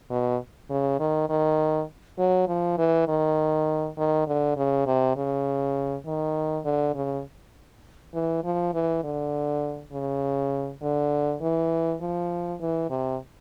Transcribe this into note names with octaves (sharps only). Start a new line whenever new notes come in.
B2
C#3
D#3
D#3
F#3
F3
E3
D#3
D#3
D3
C#3
C3
C#3
D#3
D3
C#3
E3
F3
E3
D3
C#3
D3
E3
F3
E3
C3